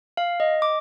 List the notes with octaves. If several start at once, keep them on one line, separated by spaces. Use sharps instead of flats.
F5
D#5
D6